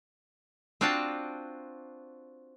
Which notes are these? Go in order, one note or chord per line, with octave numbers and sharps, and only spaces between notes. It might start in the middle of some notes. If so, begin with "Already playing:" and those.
C4 D4 F4 F#4 G5 A5